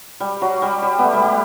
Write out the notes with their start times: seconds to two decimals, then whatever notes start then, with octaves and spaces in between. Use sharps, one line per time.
0.20 G3
0.42 F#3
0.62 G3
0.82 G3
0.99 A3 B3
1.13 G3
1.24 G3